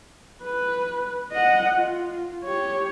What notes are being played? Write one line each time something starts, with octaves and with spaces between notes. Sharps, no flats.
B4
D#5 F#5
F4
G4 C#5